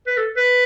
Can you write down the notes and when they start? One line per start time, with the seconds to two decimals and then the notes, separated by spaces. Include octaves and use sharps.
0.07 B4
0.17 A4
0.37 B4